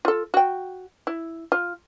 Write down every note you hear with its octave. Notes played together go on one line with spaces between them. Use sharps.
F4 A4
F#4 G5
E4
F4